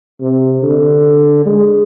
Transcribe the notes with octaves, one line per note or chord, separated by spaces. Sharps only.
C3
D3
G#3